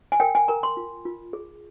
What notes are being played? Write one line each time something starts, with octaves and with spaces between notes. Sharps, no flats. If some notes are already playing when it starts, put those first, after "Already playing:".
G#5
A#4 G5
G#5
A#4 A#5
C6
F4
F4
G#4